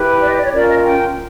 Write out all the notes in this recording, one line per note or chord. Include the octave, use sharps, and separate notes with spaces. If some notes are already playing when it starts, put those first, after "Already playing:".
Already playing: E4 G4 B4
D5
D#5
D5
C#5
C#4 F4 A#4 D5
D#5
G5